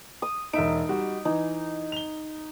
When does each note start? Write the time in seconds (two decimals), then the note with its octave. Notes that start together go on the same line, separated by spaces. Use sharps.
0.22 D#6
0.53 E1 D#4 E5 D7
0.89 G3 F#4
1.25 E3 D#4
1.92 F7 G7